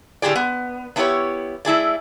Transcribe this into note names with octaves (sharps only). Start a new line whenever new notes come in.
A2 D3 G4 G#4 D5
B3
B3 D4 E4 F4 G4 C#5
A3 E4 G#4 D5